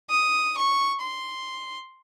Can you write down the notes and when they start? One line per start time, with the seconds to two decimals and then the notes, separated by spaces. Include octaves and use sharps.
0.10 D#6
0.57 C#6
1.01 C6